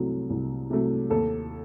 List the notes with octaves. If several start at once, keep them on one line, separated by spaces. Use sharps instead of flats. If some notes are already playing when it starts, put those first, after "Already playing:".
Already playing: C2 C3 F#3 A3
C2
C3 F#3 A3
D#2 A4